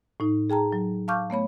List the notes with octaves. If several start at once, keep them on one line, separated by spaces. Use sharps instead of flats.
A2 D#4
G#4 G5 A5 A#5
F#3
F5 A5 C#6 D6 F6 G6
A3 B3 C#5 B5